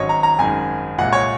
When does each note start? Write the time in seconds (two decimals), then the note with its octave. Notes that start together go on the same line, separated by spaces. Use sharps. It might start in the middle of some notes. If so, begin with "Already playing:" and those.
Already playing: G#1 G#2 F#3 C#4 C#5 D#5
0.09 A#5
0.23 A#5
0.38 G#1 F#2 D#3 G#3 G#5
0.98 C2 A#2 G#3 F#5
1.13 C#5